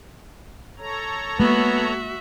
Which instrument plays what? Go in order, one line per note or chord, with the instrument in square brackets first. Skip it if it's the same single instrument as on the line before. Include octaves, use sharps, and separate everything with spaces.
[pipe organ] A4 C#5 A#5
[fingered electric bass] G#3 A#3 [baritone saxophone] B3 [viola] F#4 E5